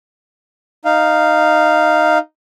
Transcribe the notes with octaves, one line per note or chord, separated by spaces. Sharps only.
D#4 F5